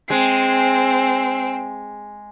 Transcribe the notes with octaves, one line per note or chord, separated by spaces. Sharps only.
G#3 C4